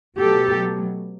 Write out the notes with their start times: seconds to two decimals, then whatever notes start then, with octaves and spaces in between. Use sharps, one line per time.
0.18 B2 F#3 A3 G4 A4